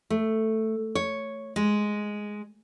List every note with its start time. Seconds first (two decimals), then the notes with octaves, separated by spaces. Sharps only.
0.10 A3
0.95 C#5
1.56 G#3